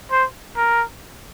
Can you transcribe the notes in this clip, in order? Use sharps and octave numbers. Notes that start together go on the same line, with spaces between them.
C5
A#4